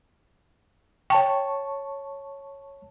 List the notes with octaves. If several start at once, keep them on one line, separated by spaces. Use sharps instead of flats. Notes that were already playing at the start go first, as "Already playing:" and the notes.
C#5 G5 A5 C#6